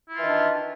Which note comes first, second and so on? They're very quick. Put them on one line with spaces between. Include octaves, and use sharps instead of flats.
E4 F4 E3 D#3 D4